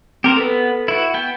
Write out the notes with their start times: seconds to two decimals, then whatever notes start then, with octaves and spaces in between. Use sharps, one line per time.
0.24 C4 G4 A#4 C5
0.37 B3 A4 B4
0.88 E4 F#4
1.14 B3 G5